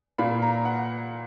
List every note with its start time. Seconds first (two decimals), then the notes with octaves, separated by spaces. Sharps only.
0.18 A#2 A#3 B5
0.42 A#5
0.65 F#5